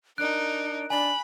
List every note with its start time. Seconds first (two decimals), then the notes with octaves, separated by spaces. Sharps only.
0.18 D4 D#4 A#4 F#6 D7
0.90 D4 G#5 B5 F#7